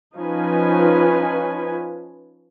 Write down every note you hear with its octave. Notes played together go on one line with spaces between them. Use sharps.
F3 C#4 D#4 F4 B4 G#5